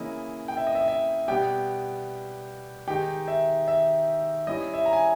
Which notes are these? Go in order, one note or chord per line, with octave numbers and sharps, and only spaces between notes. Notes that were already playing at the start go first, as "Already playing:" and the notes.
Already playing: C#3 E3 A#3 E4 D#5
G5
E5
D#5
E5
E5
B2 G3 B3 G4 G5
D#3 G#3 D#4 G4 G5
E5
E5
G3 C#4 E4 D#5
E5
A#5
G#5